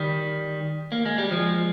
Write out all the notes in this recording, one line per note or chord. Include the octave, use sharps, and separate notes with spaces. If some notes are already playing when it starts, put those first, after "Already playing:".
Already playing: D#3 G3
A#3
G#3
G3
F3 G#3